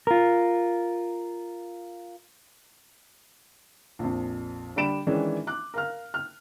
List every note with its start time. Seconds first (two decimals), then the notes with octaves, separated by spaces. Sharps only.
0.07 F4 A#4
3.99 A#1 F2
4.76 D3 G3 D4 B5 D7 E7
5.07 D#3 E3 G#3 C#4 D4
5.47 D6 F#6
5.74 A#4 F5 F6
6.14 F6